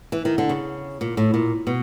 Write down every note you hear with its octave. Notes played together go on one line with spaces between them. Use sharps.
E3
D#3
D3
C#3
A#2
A2
A#2
B2